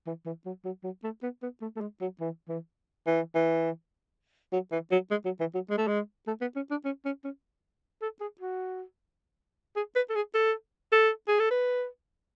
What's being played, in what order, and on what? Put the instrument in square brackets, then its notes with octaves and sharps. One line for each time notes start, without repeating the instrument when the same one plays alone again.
[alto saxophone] E3
E3
F#3
F#3
F#3
A3
B3
B3
A3
A3
G#3
F#3
E3
E3
E3
E3
F#3
E3
F#3
G#3
F#3
E3
F#3
G#3
A3
G#3
A3
B3
C#4
D4
C#4
C#4
C#4
A4
G#4
F#4
G#4
B4
A4
G#4
A4
A4
G#4
A4
B4